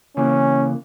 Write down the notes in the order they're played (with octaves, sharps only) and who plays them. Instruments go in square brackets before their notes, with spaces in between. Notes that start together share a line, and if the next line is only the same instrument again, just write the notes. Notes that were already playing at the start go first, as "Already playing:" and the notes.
[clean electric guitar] C#3 E3 A#3 [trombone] C#4